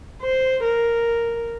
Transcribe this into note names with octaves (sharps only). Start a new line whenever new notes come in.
C5
A#4